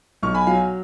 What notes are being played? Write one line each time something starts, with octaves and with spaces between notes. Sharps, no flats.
B1 C#6 F6
G#5 B5
F#3 F5 G#5